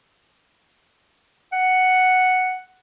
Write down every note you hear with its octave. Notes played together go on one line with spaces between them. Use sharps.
F#5